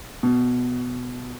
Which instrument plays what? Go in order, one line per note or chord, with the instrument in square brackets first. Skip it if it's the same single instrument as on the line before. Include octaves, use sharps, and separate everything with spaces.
[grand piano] B2